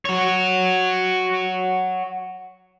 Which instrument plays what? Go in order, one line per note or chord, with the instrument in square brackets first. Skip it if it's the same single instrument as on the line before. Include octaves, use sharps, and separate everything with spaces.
[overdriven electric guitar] F#4 C#5